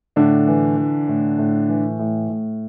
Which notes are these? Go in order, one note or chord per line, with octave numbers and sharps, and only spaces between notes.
A2 D3 D4
E3
E3
A2
A2
E3
A2
A2